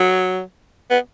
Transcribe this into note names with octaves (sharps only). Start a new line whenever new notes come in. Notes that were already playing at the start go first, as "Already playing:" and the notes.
Already playing: F#3
B3